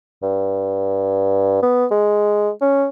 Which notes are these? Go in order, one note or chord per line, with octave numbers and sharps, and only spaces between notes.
G2
B3
G#3
C#4